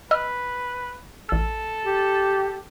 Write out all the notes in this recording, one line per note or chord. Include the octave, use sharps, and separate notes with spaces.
B4 D#5 E6 F6
A1 A4 E6
G4